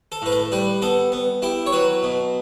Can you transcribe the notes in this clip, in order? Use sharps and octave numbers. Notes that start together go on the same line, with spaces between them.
A4
A2 B4
A4
G3 B4
B3 A4
B3
E4 G4
C#5
F#3 B4
B2